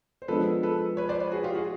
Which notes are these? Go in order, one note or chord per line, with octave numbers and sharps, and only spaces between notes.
C5
F3 G#3 B3 D4 A4 B4
A4 B4
B4 C#5
C5 D5
B4 C#5
F#4 G#4
F4 G4
F#4 G#4